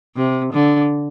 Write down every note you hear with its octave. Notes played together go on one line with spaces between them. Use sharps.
C3
D3